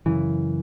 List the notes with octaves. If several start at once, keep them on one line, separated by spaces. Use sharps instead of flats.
F#2 C#3 E3